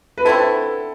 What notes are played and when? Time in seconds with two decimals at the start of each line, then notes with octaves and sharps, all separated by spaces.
0.18 B4
0.25 D3 A3 C4 E4 A4